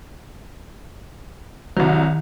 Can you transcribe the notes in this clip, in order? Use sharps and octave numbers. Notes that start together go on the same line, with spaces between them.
C2 D#3 F#3